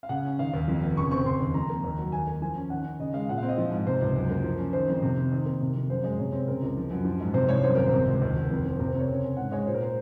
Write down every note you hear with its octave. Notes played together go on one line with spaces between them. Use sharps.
F5
C#3 F#5
C#4
D#3 F5
D#2
F2
F1
C#3 C#6
C4 C#6
C#3 C6
D#2
F2 A#5
A#3
D#2
F#3
D#2 G#5
A#3
F3 G#5
C#4
D#3 F#5
C#4
C#3 D#5
G#3 F5
A#2 F#5
C4 F5
D#5
F3
G#2
C3 C5
C#2
F#2
A#3
F3
C#4
D#3 C5
F2
C3
C4
D#3
A#3
C3
F2
F#2 C5
G#3
C3 C#5
C4
C#3 A#4
C#2
F3
F#2
F3
G#2
C3 C5
C2 C#5
F#2 C5
G#1 A#4
C5
C3
C#2
D#2
F1
F2
F3
C3 A#4
C5
C4 C#5
C#3
C#4
G#2 F#5
G#3 C#5
A#2 C5
A#4
C5